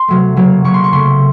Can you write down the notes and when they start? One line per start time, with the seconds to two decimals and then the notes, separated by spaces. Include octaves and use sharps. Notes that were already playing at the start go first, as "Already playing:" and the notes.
Already playing: C6
0.08 C3 F#3 A3
0.36 C#3 F#3 A#3
0.64 C#3 F#3 A#3 C#6
0.74 C6
0.84 C#6
0.92 C#3 A3 C6